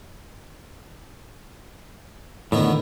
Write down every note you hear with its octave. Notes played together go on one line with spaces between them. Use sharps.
A2 D3 D#3 B3